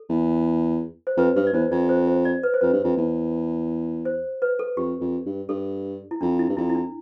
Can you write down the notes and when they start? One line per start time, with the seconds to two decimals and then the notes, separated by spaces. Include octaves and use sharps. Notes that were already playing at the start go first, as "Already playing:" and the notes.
Already playing: A4
0.09 E2
1.07 C5
1.17 F2 B4
1.36 G2 B4
1.47 D5
1.53 E2 C5
1.71 F2 D5
1.89 C5
2.08 C5
2.25 D5
2.43 B4
2.54 C5
2.61 F2 B4
2.73 G2
2.84 F2
2.97 E2
4.05 C5
4.42 B4
4.59 A4
4.77 F2 G4
5.01 F2
5.26 G2
5.49 G2 A4
6.11 E4
6.21 F2 D4
6.39 E4
6.49 G2
6.57 F2 E4
6.70 E4
6.75 D4